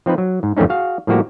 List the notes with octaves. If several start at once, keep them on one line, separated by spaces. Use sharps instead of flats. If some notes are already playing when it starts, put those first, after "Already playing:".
F3 C4 D#4 B4
F#3
G#2
G#1 F2 A3 C4 C#4 D#4
F#4 G#4 F5
A2 F3 G3 A#3 F#4 G4